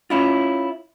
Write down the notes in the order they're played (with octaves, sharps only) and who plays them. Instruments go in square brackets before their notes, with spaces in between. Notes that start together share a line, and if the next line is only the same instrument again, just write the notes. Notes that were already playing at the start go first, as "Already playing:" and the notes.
[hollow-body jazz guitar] C#4 E4 F4